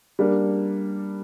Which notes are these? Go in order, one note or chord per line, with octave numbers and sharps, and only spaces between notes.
G3 A#3 D4